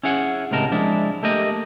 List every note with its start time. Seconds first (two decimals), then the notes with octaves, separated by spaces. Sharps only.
0.03 C#4 E4 G#4 F#5
0.51 C#2 A2 C3 A#4 D#5 A5
0.71 F3 G#3 D4 E4
1.23 A3 A#3 G4 D#5